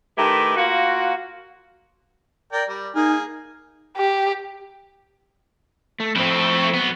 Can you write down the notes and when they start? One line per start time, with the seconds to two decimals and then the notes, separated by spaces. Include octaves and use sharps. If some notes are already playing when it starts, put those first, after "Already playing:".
0.18 D#3 A3 E4 G4 B4
0.57 A#3 F4 F#4
2.53 A#4 D5 G5
2.69 G3
2.96 A#3 D#4 G#4 F6
3.97 G4
6.00 A3
6.16 F2 A3 C4 E4
6.74 F#3 B3